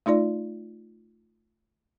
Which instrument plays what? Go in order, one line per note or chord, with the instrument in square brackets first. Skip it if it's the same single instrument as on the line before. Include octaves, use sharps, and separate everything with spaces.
[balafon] A3 D#4 F4 D5